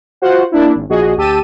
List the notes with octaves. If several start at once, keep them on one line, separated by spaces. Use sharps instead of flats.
F4 F#4 C5 F#5
A#3 D4 E4
G#1
A#1 F#4 G#4 D#5
D2 G4 A5 E6 D#7